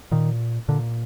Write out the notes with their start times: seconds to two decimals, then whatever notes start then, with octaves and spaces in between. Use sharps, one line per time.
0.11 A#2 D#3
0.68 A#2 D3